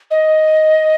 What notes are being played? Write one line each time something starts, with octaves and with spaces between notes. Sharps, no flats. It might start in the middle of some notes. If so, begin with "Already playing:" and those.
D#5